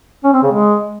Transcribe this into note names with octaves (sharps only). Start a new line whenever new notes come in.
C#4
C4
C#3
G#3